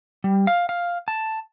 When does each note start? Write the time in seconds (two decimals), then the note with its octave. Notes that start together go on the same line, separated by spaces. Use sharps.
0.24 G3
0.47 F5
0.69 F5
1.08 A5